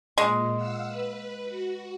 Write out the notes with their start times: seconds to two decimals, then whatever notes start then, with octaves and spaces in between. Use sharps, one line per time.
0.18 A#2 G#3
0.56 F5 F#5 E6
0.87 B4
1.45 F#4